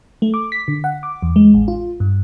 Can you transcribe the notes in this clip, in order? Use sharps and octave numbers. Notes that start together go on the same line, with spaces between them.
A3
D6
B6
D3
F#5
D6
E2
G#3
A1
F4
G2